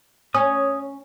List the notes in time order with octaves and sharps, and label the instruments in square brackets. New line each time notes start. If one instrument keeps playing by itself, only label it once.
[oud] C#4 [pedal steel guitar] C#5 D#6